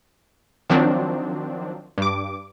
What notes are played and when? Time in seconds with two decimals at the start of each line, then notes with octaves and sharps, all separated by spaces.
0.70 D#3 F3 F#3 C4 D4
1.98 G2 D6